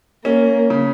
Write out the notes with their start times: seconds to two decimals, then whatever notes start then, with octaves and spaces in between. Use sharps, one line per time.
0.25 A#3 C#4
0.70 C#3